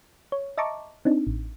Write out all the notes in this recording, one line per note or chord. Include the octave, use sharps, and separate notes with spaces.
C#5
D#5 E5 A5 A#5 C#6 D6
C4 D4 D#4
A1